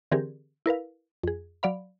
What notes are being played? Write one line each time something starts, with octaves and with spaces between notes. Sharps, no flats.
D3 E3 C4 G4 G#4 A#4
E4 A#4 B4 F5
F2 G#4
F#3 D5 F5 B5